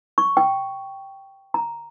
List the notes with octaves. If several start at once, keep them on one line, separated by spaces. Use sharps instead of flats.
C#6
G5
A#5